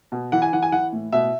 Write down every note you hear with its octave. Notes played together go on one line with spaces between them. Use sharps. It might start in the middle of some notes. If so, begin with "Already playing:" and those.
B2
E3 F#5
G#5
E3 F#5
G#5
E3 F#5
A2
B2 E5